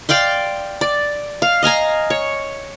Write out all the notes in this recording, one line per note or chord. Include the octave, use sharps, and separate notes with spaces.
D5 F5 G5 C6
D5
F5
D#5 F5 G#5 A#5
C#5